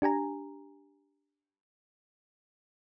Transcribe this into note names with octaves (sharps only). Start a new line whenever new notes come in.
D4 G4 G#5 A#5